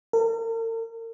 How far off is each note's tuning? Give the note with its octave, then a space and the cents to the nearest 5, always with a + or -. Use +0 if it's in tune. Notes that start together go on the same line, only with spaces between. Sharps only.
A#4 -45